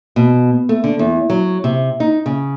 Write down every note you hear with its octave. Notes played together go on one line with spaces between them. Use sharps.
B2
A3
D3
E2
F#3
C3
D#4
C#3